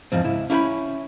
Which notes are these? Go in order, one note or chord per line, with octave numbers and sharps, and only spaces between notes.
E2 G#2 F3 C4
C#2 E4
C#4 E4 G4 G5 B5